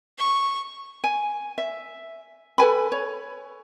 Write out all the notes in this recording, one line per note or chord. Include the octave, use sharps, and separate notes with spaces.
C#6
G#5
E5
A4 B4 G#5 B5
C#5